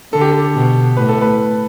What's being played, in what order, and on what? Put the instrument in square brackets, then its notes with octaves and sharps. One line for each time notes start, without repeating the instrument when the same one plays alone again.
[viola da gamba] D3 [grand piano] A4
[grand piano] G4
A4
[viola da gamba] B2
[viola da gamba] A2 [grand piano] B4
[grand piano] A4
B4